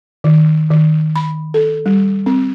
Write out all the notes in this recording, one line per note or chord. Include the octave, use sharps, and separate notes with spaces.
D#3
D#3
B5
A4
G3
C4